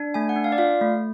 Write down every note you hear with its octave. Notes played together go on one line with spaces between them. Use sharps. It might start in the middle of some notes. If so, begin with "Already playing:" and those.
Already playing: D4
A3 G#5
F#5
D4
F5
D5
F4 F5
A3